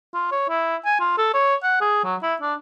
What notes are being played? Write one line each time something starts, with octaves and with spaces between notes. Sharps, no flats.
F4
C#5
E4
G#5
F4
A4
C#5
F#5
G#4
F#3
E4
D4